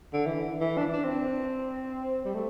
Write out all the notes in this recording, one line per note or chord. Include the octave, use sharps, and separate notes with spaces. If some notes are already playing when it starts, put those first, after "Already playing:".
D3
E3
E3
D4
D4
C4
G3
A3